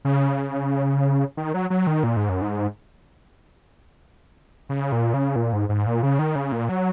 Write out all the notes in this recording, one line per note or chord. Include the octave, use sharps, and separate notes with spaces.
C#3
D#3
F#3
F#3
D#3
A#2
G#2
F#2
G#2
C#3
A#2
C#3
A#2
G#2
G#2
A#2
C#3
D#3
C#3
A#2
F#3